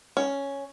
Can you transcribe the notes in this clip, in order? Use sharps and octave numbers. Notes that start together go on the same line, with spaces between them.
C#4